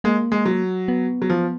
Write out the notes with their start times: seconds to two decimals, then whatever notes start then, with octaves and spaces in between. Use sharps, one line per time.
0.04 G#3 A#3
0.32 G#3
0.45 F#3
0.88 B3
1.22 F#3
1.30 F3